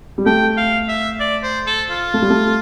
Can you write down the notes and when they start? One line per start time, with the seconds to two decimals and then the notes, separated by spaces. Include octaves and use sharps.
0.18 G3
0.26 A3 G5
0.57 F5
0.88 E5
1.20 D5
1.44 C5
1.67 A4
1.90 F4
2.14 A3
2.22 G3
2.30 A3